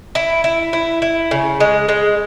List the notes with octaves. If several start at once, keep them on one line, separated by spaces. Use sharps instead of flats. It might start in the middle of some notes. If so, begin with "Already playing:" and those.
E4
E4
E4
E4
C#3
G#3
G#3